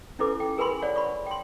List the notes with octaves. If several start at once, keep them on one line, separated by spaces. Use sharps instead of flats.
C#4 D#4 E4 A4 B4 D6
G5
G#4 A#4 B4 G#5 B5 C6
C#5 D5 F#5
B5 C#6
G5 C6